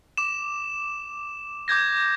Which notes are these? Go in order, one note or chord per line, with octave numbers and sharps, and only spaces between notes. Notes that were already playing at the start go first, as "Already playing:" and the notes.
D6 E7
D6 G6 G#6 A#6